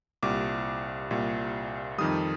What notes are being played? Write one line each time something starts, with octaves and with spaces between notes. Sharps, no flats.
C2 A#2 G3 D6
C2 A#2 G3
F2 D#3 G3 D#6